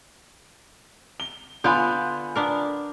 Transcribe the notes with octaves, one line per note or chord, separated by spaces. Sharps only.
G7
D3 B3 F4 G#5 B5 G6
B3 D4 A#4